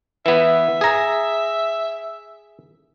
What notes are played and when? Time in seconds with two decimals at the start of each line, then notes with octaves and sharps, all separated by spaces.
0.26 E3 B3 E5
0.81 G#4 A#5